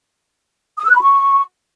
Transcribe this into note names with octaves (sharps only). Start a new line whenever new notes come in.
D#6
E6
F#6
B5
C#6